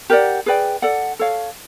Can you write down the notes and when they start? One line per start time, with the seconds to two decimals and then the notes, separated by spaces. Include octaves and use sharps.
0.10 G4 A#4 D5 F#5
0.46 G#4 B4 D5 G5
0.82 A4 D5 F#5
1.19 A4 C#5 F5